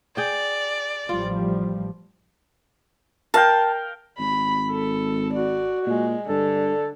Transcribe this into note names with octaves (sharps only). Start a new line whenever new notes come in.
G#4 D5 G5
A1 F3 G3 F4
A#4 F5 G5 A5
G#1 B5
A4
F#4 D5
A#2 G#3
G2 D3 A4